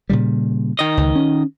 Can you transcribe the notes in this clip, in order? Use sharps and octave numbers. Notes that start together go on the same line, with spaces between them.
A#2 C#3 G3
D#3 D#5
C#2
C#4